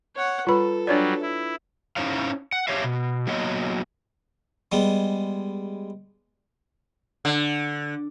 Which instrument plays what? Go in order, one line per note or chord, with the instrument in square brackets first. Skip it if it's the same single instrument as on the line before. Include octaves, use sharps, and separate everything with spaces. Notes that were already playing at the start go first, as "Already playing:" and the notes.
[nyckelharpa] C#5 F#5
[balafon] G3 B5 [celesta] F4 B4 [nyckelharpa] A4
[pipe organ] F#3 G3 [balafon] D4 C#5 D5
[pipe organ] E4
[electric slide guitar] C#4 D#4 E4 C5 C#5 F5
F#5
G4 C5 C#5 E5 F5
B2
F#3 A#3 B3 C#5 D#5
[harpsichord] G3 G#3 B3
[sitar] D3